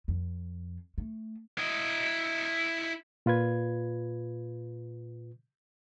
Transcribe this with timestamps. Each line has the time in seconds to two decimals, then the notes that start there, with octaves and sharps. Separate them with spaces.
0.08 F2
0.98 A3
1.58 E4 D#5
3.26 A#2 F4 B4 G#6